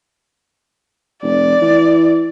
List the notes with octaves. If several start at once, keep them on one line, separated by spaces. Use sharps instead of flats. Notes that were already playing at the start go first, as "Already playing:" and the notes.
F1 D5
E3